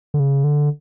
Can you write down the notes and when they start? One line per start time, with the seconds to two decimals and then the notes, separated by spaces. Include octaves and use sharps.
0.14 D3
0.20 C#3
0.44 D3